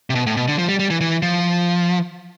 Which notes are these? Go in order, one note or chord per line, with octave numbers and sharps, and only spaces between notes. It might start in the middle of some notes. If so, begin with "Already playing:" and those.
C3
B2
A2
B2
D3
F3
G3
G3
E3
E3
F3